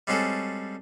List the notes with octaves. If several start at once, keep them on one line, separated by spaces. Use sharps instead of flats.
G3 G#3 C4 C#4 F#4 A4